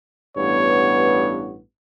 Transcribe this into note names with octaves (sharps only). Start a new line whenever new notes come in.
A1 G2 B3 C#5